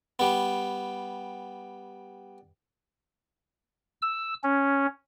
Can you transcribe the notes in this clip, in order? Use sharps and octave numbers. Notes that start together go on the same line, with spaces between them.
G3 B3
E6
C#4